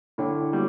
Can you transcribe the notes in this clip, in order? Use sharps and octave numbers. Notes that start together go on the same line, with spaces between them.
D3 E4 A4 C#5 G5
G3 B3 F#4